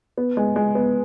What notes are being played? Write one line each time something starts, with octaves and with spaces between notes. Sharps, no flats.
B3
G#3
G#3
B3